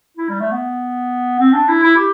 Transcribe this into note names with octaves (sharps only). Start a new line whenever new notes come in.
E4
G3
A3
B3
C4
D4
E4
E4
G4